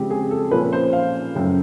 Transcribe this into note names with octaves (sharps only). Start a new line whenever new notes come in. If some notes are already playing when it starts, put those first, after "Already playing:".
Already playing: C#3 F3 G#3 C4 G4
G#4
A4
A#2 F3 A#3 C#4 B4
C5
F5
F#2 C#3 F#3 A3 G5